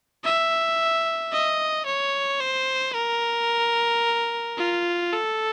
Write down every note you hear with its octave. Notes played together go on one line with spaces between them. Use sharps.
E5
D#5
C#5
C5
A#4
F4
A4